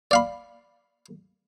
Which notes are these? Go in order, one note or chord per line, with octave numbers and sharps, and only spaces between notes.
D5 F5 B5